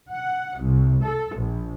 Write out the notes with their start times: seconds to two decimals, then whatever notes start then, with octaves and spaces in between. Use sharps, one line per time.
0.11 F#5
0.60 C2
1.04 A4
1.36 A#1